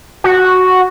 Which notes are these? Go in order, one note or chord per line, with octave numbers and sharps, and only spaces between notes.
F#4